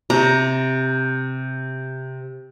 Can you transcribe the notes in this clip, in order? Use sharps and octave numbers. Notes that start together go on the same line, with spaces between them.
C3 A#5